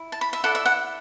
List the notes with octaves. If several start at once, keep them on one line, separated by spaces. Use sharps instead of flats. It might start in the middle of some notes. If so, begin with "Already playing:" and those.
Already playing: E4
A5
B5
E5
E4 A4 D5 F#5
E5
F#5